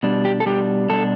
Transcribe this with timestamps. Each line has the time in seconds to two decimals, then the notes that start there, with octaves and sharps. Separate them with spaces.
0.03 B2 G3 D4
0.25 G4
0.40 A4
0.46 B2 G3 D4 G4
0.89 B2 G3 D4 A4